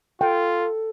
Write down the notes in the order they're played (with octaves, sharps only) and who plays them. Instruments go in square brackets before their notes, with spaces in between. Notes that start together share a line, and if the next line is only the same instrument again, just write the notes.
[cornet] F4 [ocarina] A4 [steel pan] G5